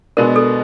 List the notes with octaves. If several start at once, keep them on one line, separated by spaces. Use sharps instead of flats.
B2 G#3 B3 D4 A#4
A4